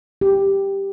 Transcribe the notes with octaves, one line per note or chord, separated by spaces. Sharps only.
G4